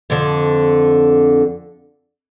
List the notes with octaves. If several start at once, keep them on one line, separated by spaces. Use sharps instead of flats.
F2 D3